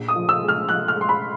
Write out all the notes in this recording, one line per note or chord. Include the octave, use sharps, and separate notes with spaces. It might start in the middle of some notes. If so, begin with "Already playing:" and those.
Already playing: A#1
D#6
F3
E6
G#3
F6
F3 F#6
F6
G#3
C6
B5